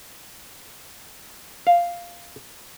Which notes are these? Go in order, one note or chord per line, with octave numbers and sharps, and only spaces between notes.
F5